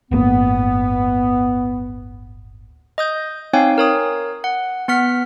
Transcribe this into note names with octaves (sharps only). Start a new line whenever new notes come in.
D1 G1 A#3 B3
D#5 D#6 G6
C4 D#4 C#5 F5 G5 G#5
A#4 C#5 D#6
F#5
B3 F#5 F6 B6